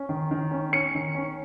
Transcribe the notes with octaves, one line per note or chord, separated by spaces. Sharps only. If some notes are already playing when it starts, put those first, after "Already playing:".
Already playing: C#4
D#3
D#3
C#4
C#4 C#7
D#3
C#4